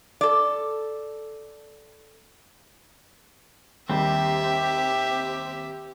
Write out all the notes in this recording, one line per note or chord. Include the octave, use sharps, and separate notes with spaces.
A4 D5
D#2 G3 C4 G4 E5